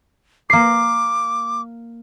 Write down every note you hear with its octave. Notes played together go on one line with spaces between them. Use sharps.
A#3 D6 C7